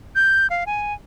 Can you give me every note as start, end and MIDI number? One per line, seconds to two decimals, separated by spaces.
0.15 0.47 91
0.50 0.64 77
0.67 0.93 80